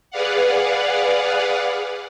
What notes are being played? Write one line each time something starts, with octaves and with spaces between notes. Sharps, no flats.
G#4 B4 D5 F5 F#5